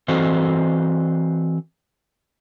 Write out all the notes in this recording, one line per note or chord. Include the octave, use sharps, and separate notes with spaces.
E3 C4 F#4 A4 C5 D#5